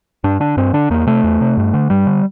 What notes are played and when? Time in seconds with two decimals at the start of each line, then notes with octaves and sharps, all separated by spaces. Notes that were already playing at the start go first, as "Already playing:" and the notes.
0.24 G2 D4
0.40 D3 D4
0.57 G2 C4
0.73 D3 D4
0.90 E2 A#3
1.07 C3 A3
1.24 E2
1.41 C3
1.57 G2
1.74 D3
1.90 G2 G3
2.07 D3